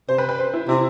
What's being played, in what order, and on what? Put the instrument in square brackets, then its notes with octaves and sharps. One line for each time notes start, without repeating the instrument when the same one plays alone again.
[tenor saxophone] C3 [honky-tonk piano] C5
[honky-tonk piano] B4
B4
C5
E4
[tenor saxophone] C3 [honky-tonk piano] E4